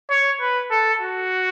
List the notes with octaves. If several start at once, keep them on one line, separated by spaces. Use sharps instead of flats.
C#5
B4
A4
F#4